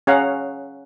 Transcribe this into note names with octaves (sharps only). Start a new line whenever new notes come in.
C#4 G#4 C#5 F5 F#5 A#5